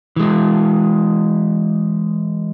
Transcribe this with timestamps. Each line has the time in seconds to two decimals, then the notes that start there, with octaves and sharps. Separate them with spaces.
0.16 E3 G#3